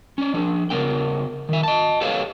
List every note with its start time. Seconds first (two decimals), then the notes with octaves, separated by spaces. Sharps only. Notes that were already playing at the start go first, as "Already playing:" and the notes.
0.18 C#4 D5
0.34 F3 D4
0.70 C#3 B3 A#4 G5
1.49 D#3 E5
1.63 D#5 A5
2.01 G4 A4 B4 C#5 D5 F5